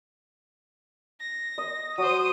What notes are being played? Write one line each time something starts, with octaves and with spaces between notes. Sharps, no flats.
A#6
D#5
F#3 C5 D#6